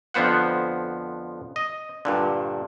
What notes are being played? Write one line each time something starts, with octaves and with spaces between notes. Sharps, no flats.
F2 D3 F3 B3 C5 F#5
D#5
G2 A#2 D3